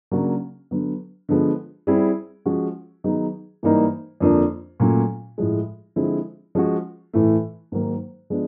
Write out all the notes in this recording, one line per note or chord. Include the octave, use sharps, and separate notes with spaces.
C#3 F#3 A#3 D4 F#4
D3 F#3 B3
D3 F3 G#3 B3
G3 C4 E4 G#4
F3 G#3 C#4 F#4
D#3 F#3 B3 D#4 G#4
G#2 E3 G3 A#3 D#4
F2 D3 F3 A#3 D4
A#2 F#3 A3 C#4
A2 F3 G#3
D3 F3 G#3 C4 E4
F3 G#3 C#4 F#4
A2 E3 A3
G#2 D#3 F#3 A#3
F3 G#3 B3 D4